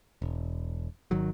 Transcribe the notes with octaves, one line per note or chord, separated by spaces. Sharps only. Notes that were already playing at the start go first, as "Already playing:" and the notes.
E1
G#1 D#3 F#3